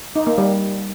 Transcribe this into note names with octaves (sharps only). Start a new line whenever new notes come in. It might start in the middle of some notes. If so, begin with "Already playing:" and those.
D#4
A#3
G3